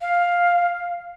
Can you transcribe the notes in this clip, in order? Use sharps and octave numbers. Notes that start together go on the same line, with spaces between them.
F5